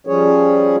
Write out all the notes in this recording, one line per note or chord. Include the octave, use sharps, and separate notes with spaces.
F3 G3 C#4 G#4 C#5